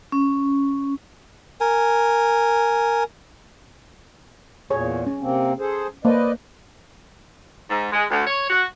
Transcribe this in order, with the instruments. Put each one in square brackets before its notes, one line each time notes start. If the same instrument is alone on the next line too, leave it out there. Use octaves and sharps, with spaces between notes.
[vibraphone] C#4
[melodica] A#4 G#5
[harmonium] E2 A#2 [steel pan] G#4 C#5
[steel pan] C#4
[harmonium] C3 A#3 C4
G#4 A4 C5
[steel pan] A#3 C5 [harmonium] B4 D5 D#5
[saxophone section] G#2
G#3
D2
C#5
F#4